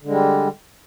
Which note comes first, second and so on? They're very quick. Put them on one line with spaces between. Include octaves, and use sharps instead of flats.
D3 G#3 G3